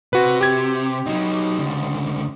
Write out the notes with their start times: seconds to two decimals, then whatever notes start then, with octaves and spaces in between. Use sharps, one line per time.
0.13 C3 F#4 B4
0.41 G4 G#6
1.06 F#3 D#4
1.58 C#2 D3